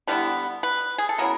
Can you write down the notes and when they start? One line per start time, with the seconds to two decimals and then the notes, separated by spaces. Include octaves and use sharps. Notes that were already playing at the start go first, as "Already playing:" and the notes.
0.07 D3 G3 B3 E4 B4
0.63 B4
0.98 G#4
1.09 A4
1.18 C#3 F#3 B3 E4 A#4